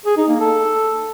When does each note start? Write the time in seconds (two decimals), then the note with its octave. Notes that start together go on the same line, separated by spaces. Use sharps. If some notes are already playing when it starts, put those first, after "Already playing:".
0.06 G#4
0.17 D#4
0.29 A#3
0.40 A4